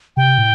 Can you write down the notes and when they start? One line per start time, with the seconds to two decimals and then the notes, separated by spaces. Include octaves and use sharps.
0.17 C3 G5
0.38 A2